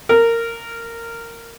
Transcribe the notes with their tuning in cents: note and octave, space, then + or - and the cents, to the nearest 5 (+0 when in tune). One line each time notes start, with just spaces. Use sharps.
A#4 -15